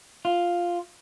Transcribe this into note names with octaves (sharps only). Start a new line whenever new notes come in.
F4